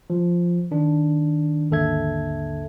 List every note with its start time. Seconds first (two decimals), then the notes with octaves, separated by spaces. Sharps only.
0.10 F3
0.71 D#3 D4
1.70 G#1 D#2 D3 A4 E5 G#6